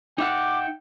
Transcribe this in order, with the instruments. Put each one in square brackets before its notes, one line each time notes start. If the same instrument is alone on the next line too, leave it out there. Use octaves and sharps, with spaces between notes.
[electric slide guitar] D#4 E5 F#5 [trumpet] G5 [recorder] D6